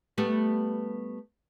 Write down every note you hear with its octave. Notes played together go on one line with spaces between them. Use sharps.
G3 A3 B3